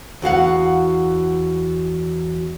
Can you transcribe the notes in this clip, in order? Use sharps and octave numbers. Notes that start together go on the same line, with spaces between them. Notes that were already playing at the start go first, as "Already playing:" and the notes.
E2 F#4 F5 F#5